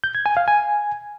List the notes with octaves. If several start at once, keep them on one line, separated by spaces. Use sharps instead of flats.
G6
G#6
G#5
F5
G#5